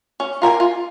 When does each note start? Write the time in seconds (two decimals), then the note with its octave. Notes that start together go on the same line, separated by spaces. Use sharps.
0.20 C#4
0.42 F4 A#4 G5 G#5
0.60 F4